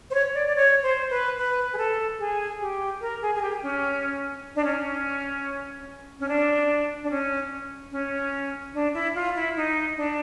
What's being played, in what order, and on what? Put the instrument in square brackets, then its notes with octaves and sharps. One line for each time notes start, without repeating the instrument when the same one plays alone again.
[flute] C5
C#5
D5
D5
C#5
C5
B4
B4
G#4
A4
G#4
G4
A#4
G#4
G#4
G4
C#4
D4
C#4
C#4
D4
D4
C#4
C#4
D4
E4
F4
E4
D#4
D4